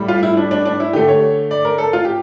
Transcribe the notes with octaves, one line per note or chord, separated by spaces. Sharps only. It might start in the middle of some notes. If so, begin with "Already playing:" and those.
Already playing: A2 G3
F4
E4
D4
D4
D4
E4
D3 A3 G4
C#5
D5
A#4
A4
F4
G4